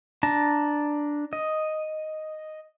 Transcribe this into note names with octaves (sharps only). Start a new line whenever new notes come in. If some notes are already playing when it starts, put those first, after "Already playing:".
D4 A5 A#5
D#5